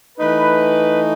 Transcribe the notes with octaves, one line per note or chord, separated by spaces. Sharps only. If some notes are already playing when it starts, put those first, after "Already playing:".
E3 A3 D#4 B4